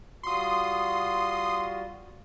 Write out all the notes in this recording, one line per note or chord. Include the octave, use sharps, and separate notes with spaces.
G3 F4 F#4 C6 D#6